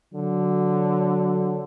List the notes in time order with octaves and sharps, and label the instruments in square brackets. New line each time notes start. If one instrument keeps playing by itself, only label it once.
[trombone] D3 [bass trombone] F#3